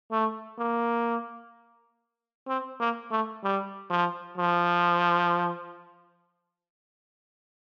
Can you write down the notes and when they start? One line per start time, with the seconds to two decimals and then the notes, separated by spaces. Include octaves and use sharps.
0.11 A3
0.59 A#3
2.48 C4
2.80 A#3
3.11 A3
3.43 G3
3.90 F3
4.38 F3